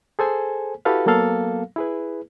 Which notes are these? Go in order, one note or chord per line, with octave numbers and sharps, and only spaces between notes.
G#4 A4 C5 G#5
E4 F#4 G4 A4 B4 F5
F#3 A#3 B3 A4 F5
E4 G#4 B4